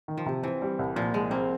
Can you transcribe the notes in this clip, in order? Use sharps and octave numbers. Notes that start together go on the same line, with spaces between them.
D#3
F3
C3
E3 C4
G3
C2
A#2 F3
C2 G#3
A#3 C4